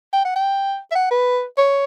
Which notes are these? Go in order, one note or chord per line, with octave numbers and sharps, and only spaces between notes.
G5
F#5
G5
E5
F#5
B4
C#5